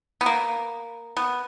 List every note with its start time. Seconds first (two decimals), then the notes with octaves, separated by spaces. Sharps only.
0.21 B3
0.26 A#3
1.17 B3